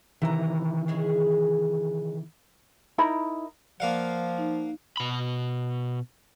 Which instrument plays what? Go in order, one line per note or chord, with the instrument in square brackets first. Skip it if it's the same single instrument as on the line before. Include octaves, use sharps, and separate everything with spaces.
[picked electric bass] C3 D#3 E3 [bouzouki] E4 A#5
[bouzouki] C#3 G#3 G#4
[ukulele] D#4 E4 A#4 B5
[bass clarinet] F3 [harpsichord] A#3 F5 F#5 [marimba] D5
[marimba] D#4
[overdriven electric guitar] B2 B5